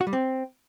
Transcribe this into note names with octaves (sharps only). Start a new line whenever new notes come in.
F#4
G3
C4